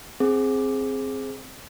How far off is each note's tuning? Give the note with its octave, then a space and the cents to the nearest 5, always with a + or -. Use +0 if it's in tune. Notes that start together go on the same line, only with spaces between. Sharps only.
C4 +5 G#4 +0